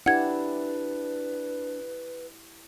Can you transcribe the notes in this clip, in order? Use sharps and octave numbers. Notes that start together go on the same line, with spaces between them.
D4 E4 G4 B4 F#5 G#6